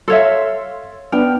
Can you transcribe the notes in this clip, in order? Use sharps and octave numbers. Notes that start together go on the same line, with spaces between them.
A4 C#5 E5 F5 C6
B3 D4 G5 F6